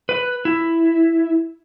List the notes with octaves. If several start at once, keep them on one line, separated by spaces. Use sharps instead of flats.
B4
E4